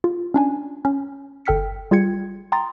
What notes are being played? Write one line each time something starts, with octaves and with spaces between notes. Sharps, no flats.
F4
C#4 D4 G#5
C#4
G1 A4 G5 F6 B6 C#7
G3 F4 G#4 G5 G#6 C#7
G5 A#5 C6 D#6 A6